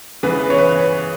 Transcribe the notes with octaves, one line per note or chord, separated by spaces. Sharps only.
C#3 E3 B3 B4
C#5
B4